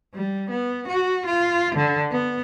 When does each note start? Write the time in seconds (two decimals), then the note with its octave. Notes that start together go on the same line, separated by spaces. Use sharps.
0.14 G3
0.50 B3
0.88 F#4
1.26 F4
1.75 D3
2.12 B3